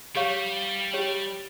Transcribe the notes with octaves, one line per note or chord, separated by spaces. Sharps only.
G3 G4 C#5 F5 C#6
G4 C#5 G5